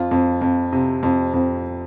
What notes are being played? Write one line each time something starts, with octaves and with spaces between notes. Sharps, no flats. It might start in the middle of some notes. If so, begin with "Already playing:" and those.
Already playing: F2 F4
F2
F2
C3
F2
F2